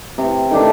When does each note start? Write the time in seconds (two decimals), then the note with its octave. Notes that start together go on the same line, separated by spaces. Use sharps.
0.18 C3
0.51 D#3 A3 D4